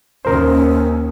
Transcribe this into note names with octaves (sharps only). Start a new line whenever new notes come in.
D#2 C#4 A#4 C5